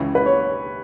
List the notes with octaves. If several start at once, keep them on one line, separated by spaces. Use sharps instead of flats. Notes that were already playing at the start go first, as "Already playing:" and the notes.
Already playing: C#2 C#3 E3
B4
C#5